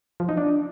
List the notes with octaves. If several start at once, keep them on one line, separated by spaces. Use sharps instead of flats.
F3
D#4
D4